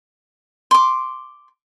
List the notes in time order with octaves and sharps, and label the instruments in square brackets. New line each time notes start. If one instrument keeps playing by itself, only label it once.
[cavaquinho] C6 D6